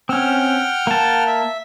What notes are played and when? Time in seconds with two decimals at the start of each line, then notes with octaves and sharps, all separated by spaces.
0.09 C4 C#4 F#5 G5 F6
0.87 A#3 A5
1.27 E5